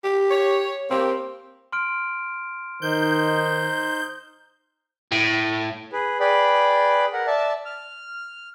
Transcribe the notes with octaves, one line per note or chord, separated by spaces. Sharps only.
G4
C#5
A#3 C4 G4
C6 F6 D7
D#3 D#4 C5 G6
A2
G#4 B4
G#4 B4 D5 G5 B5
A#4 F#5
D5 E5 A5
F6